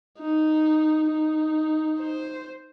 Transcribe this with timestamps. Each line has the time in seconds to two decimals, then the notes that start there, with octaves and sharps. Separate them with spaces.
0.19 D#4
1.10 D#4
2.00 C5